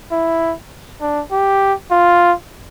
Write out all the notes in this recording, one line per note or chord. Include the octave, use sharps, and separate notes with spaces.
E4
D4
G4
F4